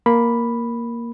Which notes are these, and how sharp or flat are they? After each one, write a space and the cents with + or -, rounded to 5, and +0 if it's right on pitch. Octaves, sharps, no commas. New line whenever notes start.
A#3 +5 B5 +0